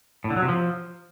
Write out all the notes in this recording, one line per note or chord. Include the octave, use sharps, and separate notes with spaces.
A2
D3
F#3
C3
F3